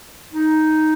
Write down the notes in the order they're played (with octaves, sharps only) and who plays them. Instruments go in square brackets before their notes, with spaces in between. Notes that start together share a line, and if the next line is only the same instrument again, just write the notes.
[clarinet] D#4